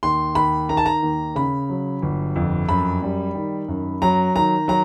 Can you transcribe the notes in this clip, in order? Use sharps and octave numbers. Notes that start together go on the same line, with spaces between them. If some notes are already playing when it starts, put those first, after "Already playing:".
D#2 C6
D#2 B5
D#3 A#5
A5
A#5
D#2
C#3 B5
F#3
G1
F2
F#2 B5
G3
D#3
F#2
F#3 A#5
D#3 A#5
F#3 A#5